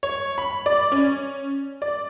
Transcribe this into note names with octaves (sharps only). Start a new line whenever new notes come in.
C#5
B5
D5
C#4
D5